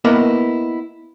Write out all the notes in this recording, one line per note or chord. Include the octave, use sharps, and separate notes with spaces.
A#3 B3 E4 A#4 B4 D#5